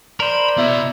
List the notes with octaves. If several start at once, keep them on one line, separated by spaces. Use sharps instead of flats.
A#4 C5 D5 B5
B2 B3 E4